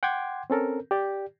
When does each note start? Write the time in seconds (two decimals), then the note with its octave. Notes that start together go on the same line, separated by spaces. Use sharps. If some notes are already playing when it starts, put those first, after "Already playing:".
0.03 F#5 G5 C6 D6 G#6
0.50 C4 C#4 A4 A#4
0.91 G4 D5